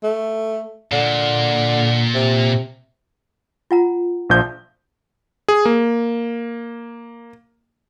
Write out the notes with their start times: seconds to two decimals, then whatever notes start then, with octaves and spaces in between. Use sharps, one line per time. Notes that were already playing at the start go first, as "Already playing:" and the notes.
0.03 A3
0.92 A#2 D3
2.14 C3
3.71 F4 F#5 A#5
4.29 A#1 F3 G6
5.48 G#4
5.65 A#3